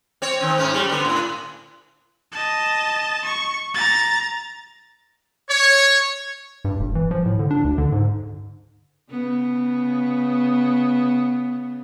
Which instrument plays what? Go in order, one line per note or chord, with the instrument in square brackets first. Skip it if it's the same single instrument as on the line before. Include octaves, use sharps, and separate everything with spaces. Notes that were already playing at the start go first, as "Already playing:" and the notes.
[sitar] C4 C#5
D#3 C4
G#2 C#4
F#3 G3
D3 B3
A2
[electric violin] D#5 A5
C#6
A#5 A6
[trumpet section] C#5
[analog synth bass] G2
E1
E3
F3
A2
D3
D4
D2
D3
G#2
[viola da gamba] C#3 B3